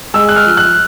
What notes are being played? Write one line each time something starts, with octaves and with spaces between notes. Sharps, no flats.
G#3 E6
F#6
F6
F3
F#6